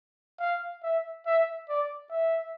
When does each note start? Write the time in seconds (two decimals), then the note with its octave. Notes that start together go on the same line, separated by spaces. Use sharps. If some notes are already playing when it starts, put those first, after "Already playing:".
0.39 F5
0.83 E5
1.26 E5
1.69 D5
2.10 E5